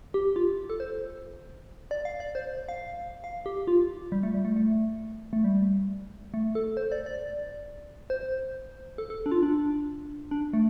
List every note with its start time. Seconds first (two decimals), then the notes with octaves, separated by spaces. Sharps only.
0.14 G4
0.36 F4
0.70 A4
0.80 C5
1.91 D5
2.05 F5
2.20 D5
2.35 C5
2.69 F5
3.24 F5
3.46 G4
3.67 F4
4.12 G3
4.23 A3
4.34 G3
4.45 A3
4.56 A3
5.33 A3
5.44 G3
6.34 A3
6.55 A4
6.77 C5
6.92 D5
7.06 D5
8.10 C5
8.98 A4
9.10 A4
9.26 D4
9.31 F4
9.43 D4
10.31 D4
10.53 A3